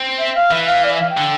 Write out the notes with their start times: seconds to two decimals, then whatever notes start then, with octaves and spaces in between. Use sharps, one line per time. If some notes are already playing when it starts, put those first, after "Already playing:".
Already playing: C4
0.18 E5
0.35 F5
0.51 E3 E5
0.67 F5
0.83 D5
0.93 E5
1.01 F5
1.09 G5
1.17 D3